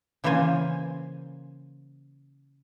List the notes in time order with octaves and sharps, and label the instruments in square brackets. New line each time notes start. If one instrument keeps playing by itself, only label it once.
[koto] C#3 E3 A#3 F4 C5 G#5